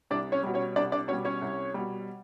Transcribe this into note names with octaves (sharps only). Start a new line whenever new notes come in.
C2 D4 D5
C#4 C#5
B2 G3
C#4 C#5
C2 D4 D5
D4 D5
B2 G3 C#4 C#5
C#4 C#5
C2
B2 G3